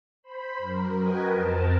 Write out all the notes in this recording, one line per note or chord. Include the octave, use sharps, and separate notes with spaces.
C5 B5
F#2 A#4
F#4 A#4 B4 D#5 G5 G#5
F2 C4 A#4 A5